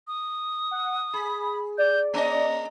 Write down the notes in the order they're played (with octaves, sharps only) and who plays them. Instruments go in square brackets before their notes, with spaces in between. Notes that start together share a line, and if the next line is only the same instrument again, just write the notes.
[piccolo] D#6
[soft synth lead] F#5
[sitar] G#4 [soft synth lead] B5
[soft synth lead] D5 [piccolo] G6
[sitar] A#3 C#4 D#5 [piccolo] A#5